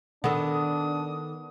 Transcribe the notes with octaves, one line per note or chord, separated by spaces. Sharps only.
D#3 B3 D4 A4 D#6